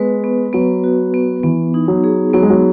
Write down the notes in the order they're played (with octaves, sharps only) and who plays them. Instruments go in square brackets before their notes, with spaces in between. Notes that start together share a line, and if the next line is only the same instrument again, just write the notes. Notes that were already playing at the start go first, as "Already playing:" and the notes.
Already playing: [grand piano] G#3 [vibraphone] B3 B4
[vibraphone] B3
[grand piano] F#3 [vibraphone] B3
[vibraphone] F#4
B3
[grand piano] E3 [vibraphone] B3
[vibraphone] D#4
[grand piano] F#3
[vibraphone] G#4
[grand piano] F#3 [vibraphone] B3
[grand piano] G#3
F#3